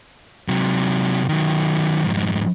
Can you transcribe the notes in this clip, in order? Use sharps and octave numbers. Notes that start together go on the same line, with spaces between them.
C3 F#3
D#3 F#3
F2 G#2